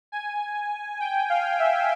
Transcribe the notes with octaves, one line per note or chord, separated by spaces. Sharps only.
G#5
G5
F5
E5